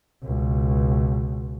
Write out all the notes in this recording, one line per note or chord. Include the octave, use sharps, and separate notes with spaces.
C#2 B2